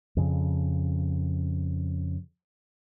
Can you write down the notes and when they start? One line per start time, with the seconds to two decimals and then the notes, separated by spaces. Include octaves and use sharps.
0.17 F2 C#3